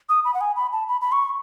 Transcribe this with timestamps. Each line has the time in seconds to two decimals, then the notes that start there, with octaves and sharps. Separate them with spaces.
0.09 D#6
0.25 B5
0.34 F#5
0.41 G#5
0.56 B5
0.73 A5
0.88 B5
1.01 B5
1.12 C#6